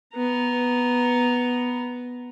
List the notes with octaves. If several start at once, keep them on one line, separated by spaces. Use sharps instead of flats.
B3 A#5